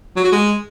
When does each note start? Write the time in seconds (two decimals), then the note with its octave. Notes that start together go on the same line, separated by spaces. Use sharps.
0.16 F#3
0.24 F#4
0.32 G#3